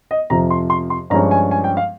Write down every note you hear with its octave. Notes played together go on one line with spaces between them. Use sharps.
D#5
F2 C3 F3 A#5
C6
C6
C6
G2 F3 G#3 C#4 A#5
G#5
G#5
G5
F5